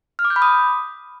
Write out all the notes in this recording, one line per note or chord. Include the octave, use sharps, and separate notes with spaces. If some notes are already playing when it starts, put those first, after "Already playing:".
F6
D6
G6
B5
D#6